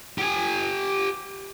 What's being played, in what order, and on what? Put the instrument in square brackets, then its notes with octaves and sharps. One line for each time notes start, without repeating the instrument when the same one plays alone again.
[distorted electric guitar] G4 G#5